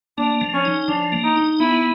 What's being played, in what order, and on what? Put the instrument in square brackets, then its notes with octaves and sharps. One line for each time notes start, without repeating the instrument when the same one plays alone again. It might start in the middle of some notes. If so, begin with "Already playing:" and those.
[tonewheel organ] A#3 [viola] D4
[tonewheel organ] F3
[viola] C#4
[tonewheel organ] D#4
[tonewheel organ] F3 [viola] D4
[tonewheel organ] A#3
[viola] D#4
[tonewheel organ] D#4
[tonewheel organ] B3 [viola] E4